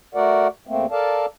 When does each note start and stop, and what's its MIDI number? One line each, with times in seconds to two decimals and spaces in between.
0.15 0.47 57
0.15 0.47 66
0.15 0.47 70
0.15 0.47 74
0.15 0.47 78
0.67 0.86 40
0.67 0.86 57
0.67 0.86 58
0.67 0.86 60
0.91 1.26 69
0.91 1.26 70
0.91 1.26 74
0.91 1.26 77
0.91 1.26 81